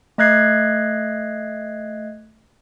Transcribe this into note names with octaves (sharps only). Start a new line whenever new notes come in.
A3 D#5 F#6 G#6 C7